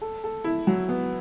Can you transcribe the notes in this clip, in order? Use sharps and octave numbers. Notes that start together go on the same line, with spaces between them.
A4
A4
E4
F#3
B3